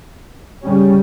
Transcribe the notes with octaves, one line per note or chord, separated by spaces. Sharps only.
C#3 G3 C#4